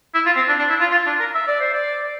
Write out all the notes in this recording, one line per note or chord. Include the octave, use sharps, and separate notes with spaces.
E4
F4
C4
D4
D4
E4
F4
F4
D4
A#4
E5
D5
C5
D5